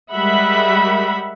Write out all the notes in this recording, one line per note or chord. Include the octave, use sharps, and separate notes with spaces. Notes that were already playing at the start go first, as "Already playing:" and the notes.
G3 G#3 A#4 E5 F#5 B5